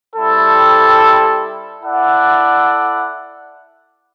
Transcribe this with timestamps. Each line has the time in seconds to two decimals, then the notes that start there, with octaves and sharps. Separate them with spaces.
0.15 G3 C4 E4 A4
1.82 E4 A4 D5 F#5